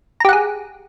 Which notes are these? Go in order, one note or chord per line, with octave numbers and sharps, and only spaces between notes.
G4 G#4 F#5 A#5